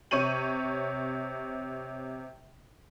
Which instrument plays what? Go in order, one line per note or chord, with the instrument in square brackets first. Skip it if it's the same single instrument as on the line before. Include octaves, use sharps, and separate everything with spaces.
[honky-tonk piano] C3 C#5 C#6 D#7 F#7